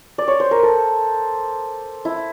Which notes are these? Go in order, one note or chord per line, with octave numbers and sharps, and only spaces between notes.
D5
C#5
C5
A#4
A4
E4